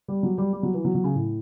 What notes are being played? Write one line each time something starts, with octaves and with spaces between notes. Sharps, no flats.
G3
F#3
G3
G3
F#3
E3
F#3
F#3
C#3
A2